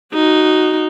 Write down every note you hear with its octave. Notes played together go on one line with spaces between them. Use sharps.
D#4 F#4